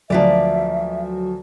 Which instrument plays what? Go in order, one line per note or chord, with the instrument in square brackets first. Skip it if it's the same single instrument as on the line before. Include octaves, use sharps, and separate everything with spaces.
[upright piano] D2 F3 [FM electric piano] F#3 F#4 [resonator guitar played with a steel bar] A#3 B4 D5 [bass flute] E5